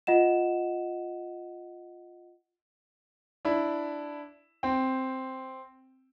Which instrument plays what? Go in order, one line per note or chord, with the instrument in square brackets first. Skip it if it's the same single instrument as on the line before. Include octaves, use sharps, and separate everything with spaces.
[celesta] F4 D#5 F#5 E7
[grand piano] D4 E4
C4 G5